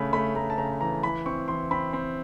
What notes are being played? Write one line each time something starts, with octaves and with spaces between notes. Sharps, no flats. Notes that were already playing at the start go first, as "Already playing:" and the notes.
Already playing: C#3 A3 B5
A3 B5
A3 A#5
A5
C#3 A#5
E3 A#5
E3 B5
C4 C#6
E3 C6
C4 B5
C4